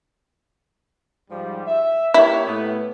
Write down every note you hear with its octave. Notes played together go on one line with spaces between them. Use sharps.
G#2 F3 G3
E5
A#3 E4 G4 C#5
A2 B3